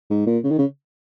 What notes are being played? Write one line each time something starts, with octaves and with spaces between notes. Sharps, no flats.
G#2
A#2
C#3
D#3
C#3